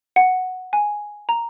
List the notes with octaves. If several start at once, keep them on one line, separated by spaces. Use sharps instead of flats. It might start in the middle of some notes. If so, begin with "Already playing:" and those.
F#5
G#5
A#5